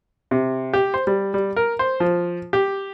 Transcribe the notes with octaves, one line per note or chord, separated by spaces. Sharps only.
C3
G4
C5
G3
G3
A#4
C5
F3
G4